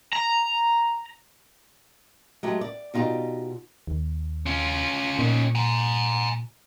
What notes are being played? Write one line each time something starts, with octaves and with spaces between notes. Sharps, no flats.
A#5
F#3 G#3 A3 G4
D5
B2 D#4 F4 G4 D5
D#2
C#4 F4
A#2 C#4 D#4
G#5 A#5